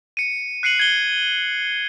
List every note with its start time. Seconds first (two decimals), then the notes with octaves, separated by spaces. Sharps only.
0.17 C#7 D#7
0.63 F#6 C7 C#7 D#7 F#7
0.79 G#6 G7